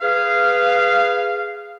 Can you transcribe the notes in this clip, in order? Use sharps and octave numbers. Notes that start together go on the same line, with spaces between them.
G#4 B4 F5